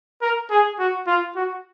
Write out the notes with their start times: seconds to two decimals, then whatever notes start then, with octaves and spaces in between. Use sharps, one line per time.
0.22 A#4
0.50 G#4
0.79 F#4
1.07 F4
1.36 F#4